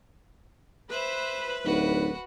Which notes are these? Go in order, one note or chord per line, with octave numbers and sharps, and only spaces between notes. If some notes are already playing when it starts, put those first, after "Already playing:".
B4 C5 E5 B5
D1 D#4 F#4